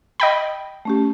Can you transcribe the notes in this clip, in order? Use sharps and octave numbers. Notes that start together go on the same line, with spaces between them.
D#5 G5 B5
A3 C#4 G4